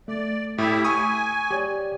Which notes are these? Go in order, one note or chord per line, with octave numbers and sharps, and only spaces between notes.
A3 D5
A2 E4 G4 E5
G#5 C#6 D#6
G4 C#5 D5